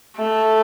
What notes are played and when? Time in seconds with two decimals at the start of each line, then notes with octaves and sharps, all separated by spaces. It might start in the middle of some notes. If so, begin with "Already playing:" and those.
0.17 A3